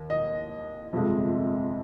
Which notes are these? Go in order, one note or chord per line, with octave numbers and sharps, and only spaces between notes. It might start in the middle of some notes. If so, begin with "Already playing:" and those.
Already playing: D#2
D#5
G1 F2 C3 F3 G#3